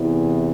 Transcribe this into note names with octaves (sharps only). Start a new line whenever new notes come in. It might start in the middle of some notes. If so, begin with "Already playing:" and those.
Already playing: E2 C3 E3